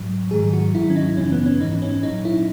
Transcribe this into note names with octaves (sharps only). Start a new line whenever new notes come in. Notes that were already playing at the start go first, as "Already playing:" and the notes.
Already playing: G#2 F#3
G#2 D#3 F#3 G#4
F#4
G#2 D#3 F#3 E4
C#4
D#4
F#2 C#3 E3 C#4
B3
C#4
G#2 E3 D#4
C#4
A#2 F#3 D#4
E4